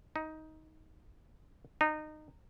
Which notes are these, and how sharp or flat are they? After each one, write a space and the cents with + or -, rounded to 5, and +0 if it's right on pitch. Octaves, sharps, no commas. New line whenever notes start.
D#4 +15
D#4 -20